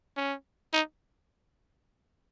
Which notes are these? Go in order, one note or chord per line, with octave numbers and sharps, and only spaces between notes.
C#4
D#4